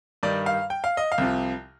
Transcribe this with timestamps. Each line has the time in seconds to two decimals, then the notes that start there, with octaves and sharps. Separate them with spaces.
0.23 G2 D#3 G3 D5
0.46 F5
0.70 G5
0.84 F5
0.97 D#5
1.12 F5
1.18 C2 C3 F3